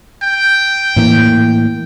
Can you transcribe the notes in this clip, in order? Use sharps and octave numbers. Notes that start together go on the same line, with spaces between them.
G5
A2 E3 A#3